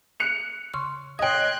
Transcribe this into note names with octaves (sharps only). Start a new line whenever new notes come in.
F#6 C#7 F7
C#3 C6 C#6
C#5 D#5 G5 C6 D#6 F#6 G#6